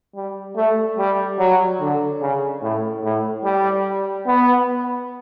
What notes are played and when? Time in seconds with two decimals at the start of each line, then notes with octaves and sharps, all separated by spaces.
0.16 G3
0.56 A3
0.98 G3
1.39 F#3
1.81 D3
2.21 C#3
2.62 A2
3.04 A2
3.44 G3
4.26 B3